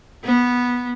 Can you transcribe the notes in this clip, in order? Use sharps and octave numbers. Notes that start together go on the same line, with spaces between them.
B3